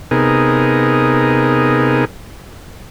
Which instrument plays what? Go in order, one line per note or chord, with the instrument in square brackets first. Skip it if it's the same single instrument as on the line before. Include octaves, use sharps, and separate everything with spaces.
[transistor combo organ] C3 B3 D#4 G#4 A#4